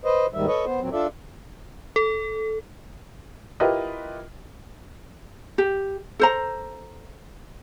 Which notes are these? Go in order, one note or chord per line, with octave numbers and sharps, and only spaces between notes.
B4 C5 D#5
D#2 G#2 D#3 G3 E5
A4 B4 C#5 D#5
B3 C5
E2 A#2 F#3 C4
D4 F4 A4 D5 E5
A4
E4 F4 G4 A#4 B4 D#5
G4
A4 C5 A#5